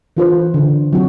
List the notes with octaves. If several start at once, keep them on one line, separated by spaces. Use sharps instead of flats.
E3 F4 B4 C5
D3
F#3 C4 F#4